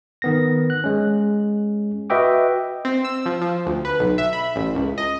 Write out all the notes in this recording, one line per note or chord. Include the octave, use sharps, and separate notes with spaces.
D#3 B3 A#6
F#6
G#3 C#4
F#4 B4 D#5 E5 G5 D6
C4
E6
F3
F3
D2
B4
B1
E5
B5
A1
C#2
D#5